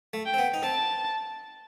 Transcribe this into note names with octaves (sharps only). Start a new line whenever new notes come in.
A3
G5
C4
B3
D#4
C4 A5